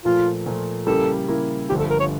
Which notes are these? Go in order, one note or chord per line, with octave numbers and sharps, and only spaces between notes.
A#2 F3 A3 F4
A#2 F3 A3
C#3 G3 A#3 E4 A4 A#4
C#3 G3 A#3 E4 A#4
G1 G2 D3 F3 A3 G4
A4
A#4
C#5